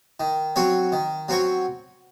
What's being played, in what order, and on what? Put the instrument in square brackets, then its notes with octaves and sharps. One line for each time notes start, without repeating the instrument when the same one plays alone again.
[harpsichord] D#3
F#3 C4 F#4 C#5
D#3
F#3 C4 F#4 C#5